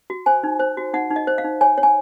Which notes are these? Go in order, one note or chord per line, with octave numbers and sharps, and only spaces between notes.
F#4
C5 G#5
D#4
C5
F#4
D#4 F#5
D#4
D#5
C5
F5
D#4
C#5 G#5
C#5
G#5